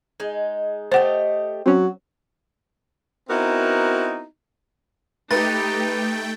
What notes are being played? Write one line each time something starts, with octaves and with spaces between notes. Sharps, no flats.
G#3 D#4
A3 G4 C5 D#5 F#5
F#3 C4 C#4
B3 C4 D#4 E4 F#4 A#4
A3 D#4 G4 B4 G5 A6